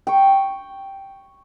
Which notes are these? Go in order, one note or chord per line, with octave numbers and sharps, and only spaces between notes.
G5 C#6